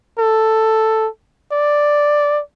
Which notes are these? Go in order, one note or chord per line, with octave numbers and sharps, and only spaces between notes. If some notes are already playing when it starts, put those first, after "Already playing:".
A4
D5